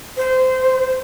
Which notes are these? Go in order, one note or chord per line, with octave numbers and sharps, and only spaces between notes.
C5